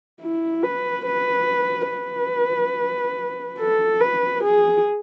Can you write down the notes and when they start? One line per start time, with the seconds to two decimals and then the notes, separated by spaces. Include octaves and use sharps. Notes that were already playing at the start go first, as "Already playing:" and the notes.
0.22 E4
0.63 B4
1.06 B4
1.90 B4
3.59 A4
4.01 B4
4.44 G#4